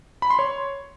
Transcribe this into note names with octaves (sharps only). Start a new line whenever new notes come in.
B5
C6
C#5